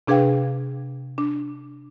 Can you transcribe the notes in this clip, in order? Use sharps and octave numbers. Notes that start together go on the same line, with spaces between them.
C3 D4 G#4 B4 F5 G5
D4